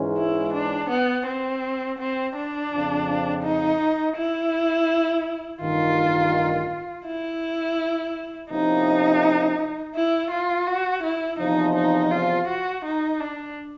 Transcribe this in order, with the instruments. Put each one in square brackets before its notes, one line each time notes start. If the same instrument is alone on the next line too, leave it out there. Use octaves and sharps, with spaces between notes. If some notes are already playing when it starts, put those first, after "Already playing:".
Already playing: [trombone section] G#2 E3 G#3 C#4
[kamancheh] E4
D4
B3
C4
C4
D4
[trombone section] F2 C#3 F3
[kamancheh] D#4
E4
[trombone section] A1 G2 D#3 [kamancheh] F4
[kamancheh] E4
[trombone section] C3 F3 A#3 C#4 E4 [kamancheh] D#4
[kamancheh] E4
F4
F#4
E4
[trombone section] E2 C3 F3 [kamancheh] D#4
[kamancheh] D#4
F4
F#4
D#4
D4